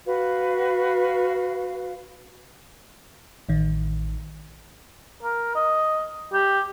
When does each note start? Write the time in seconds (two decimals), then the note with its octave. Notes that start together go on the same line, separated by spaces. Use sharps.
0.05 F#4 B4 F5
3.49 A1 D#3
5.23 A#4
5.55 D#5
6.33 G4